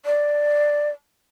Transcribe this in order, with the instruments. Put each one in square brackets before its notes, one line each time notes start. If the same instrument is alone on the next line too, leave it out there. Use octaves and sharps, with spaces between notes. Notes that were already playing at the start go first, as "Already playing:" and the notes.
[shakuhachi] D5